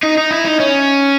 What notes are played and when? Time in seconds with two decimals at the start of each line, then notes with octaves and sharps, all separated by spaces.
0.03 D#4
0.17 D#4
0.31 E4
0.45 D#4
0.60 C#4